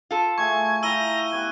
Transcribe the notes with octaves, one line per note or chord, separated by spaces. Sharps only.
F4 A4
A3 G#4 C#6 G#6
E4 F5 G5 A#5 E6 D#7 G7
B3 F#4 G4 G#6